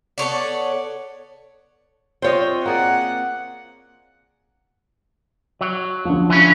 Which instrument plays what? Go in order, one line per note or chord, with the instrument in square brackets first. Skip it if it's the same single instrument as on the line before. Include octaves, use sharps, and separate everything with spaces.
[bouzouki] B3 A4 C#5 D5
[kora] C4 F4 D#5 [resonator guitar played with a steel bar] C5 C#5
[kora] A#3 G#4 D5 [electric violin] F#5
[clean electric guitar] F#3
[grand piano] D3 F3
[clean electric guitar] E3 C#4